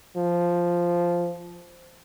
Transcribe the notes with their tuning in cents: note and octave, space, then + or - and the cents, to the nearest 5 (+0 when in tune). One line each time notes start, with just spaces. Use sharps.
F3 -5